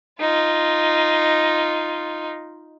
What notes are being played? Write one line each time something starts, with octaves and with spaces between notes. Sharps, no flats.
D#4 F4